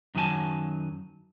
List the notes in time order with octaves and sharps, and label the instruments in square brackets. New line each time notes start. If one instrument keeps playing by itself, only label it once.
[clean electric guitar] F#2 D#3 F#3 D4 G#5 A5